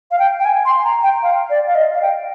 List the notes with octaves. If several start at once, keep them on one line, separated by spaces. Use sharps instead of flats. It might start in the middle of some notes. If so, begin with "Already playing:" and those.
F5
G5
G5
G#5
C6
A#5
G5
F5
D5
F5
D#5
F5
G5